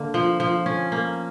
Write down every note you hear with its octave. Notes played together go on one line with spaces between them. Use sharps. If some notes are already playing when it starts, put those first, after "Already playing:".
Already playing: D3 A#3
F3
F3
C#4
A#3